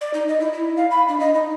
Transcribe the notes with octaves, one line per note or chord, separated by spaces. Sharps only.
D5
D#4
D#5
E4
E4
F5
B5
D4
D#5
D#4